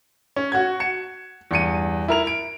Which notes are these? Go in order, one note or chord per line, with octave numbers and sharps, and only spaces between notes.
C#4
F#4 F#5 G#6
C#7 E7
E2 G2 C#7 D#7
E4 A#4 F7
D7